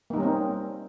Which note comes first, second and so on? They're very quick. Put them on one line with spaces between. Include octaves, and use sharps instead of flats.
A#3 D#4 G3 C#4 C4